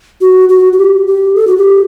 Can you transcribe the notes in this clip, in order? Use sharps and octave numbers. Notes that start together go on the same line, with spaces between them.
F#4
F#4
F#4
G4
G4
A4
F#4
G4